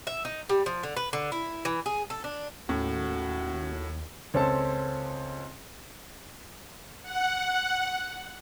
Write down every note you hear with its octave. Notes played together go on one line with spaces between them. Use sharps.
E5
D#4
G3
F3
D3
B4
D3
E4
E3
G#4
A4
D4
D#2 A2 C#4 F#4
C#2 C4 C#4 A4 A5
F#5